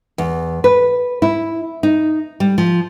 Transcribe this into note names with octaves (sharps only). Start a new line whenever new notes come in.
E2
B4
E4
D#4
G3
F3